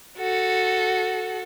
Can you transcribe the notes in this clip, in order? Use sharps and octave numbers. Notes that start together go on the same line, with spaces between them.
F#4 A4